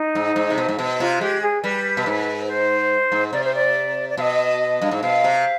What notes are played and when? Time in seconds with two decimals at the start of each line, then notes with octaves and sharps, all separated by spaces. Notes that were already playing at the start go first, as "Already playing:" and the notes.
Already playing: D#4
0.15 G#2
0.36 G#2
0.50 C3
0.58 B2
0.68 G#2
0.79 B2
1.00 C3 F4
1.21 G#3 G4
1.42 G#4
1.63 G3 B4
1.97 B2
2.06 G#2
2.48 C5
3.12 G#2
3.33 C3 D5
3.44 C5
3.55 D5
4.10 D5
4.17 B2 F5
4.21 D#5
4.82 G2
4.91 G#2
5.02 B2 F5
5.24 C3